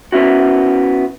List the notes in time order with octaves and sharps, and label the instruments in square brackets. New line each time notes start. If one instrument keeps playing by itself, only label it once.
[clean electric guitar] B3 C#4 E4 F#4